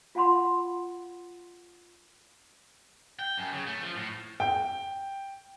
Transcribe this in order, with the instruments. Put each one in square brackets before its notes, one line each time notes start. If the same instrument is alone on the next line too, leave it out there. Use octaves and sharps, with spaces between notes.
[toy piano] F4 F5 F#5 B5 C6
[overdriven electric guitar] G5
F#2
C#3
A3
F3
A2
[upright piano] G5